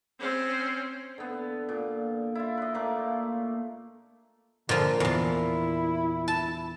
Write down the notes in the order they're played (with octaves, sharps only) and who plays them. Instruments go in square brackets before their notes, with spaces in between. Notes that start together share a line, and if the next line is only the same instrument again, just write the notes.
[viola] C4 C#4
[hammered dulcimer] D3 B3
A#2
E4 F4
B4 D#5
A#2 A3 A#3 D6
[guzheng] A#2 F3 [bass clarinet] D3
[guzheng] E2 A#2 [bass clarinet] E4
[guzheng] A5